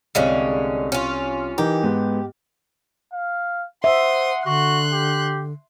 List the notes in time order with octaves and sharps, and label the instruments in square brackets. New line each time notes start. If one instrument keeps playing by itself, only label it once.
[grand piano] C2 F5 [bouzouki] D3 G#3 C#4
[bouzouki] C#4 F4
[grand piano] E3 D#4 A#4 [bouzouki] G4
[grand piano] G#2 B3
[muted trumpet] F5
[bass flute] C5 [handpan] E5 [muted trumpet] F#5 [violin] C6 D#6
[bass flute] D3 [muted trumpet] F#4 [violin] C6 F#6
[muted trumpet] G4